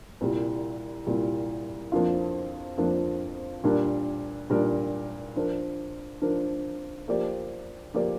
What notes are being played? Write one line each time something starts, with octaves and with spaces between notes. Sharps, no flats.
C2 A#2 G3
C2 A#2 G3
F2 F3 A#3 D4 F4
F2 F3 A#3 D4 F4
A#2 G3 D4 A#4
A#2 G3 D4 A#4
F3 D4 A#4
F3 D4 A#4
F3 A#3 G4 D5
F3 A#3 G4 D5